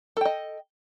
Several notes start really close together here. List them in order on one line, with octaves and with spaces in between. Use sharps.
A4 G5 D#5